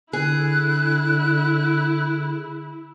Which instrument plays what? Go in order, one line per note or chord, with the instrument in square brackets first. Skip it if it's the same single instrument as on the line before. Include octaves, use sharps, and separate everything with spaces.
[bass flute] D3 [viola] E4 [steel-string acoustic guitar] G#4 [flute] F#6